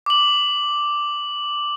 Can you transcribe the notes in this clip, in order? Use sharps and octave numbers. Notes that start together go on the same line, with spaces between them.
D6 F#7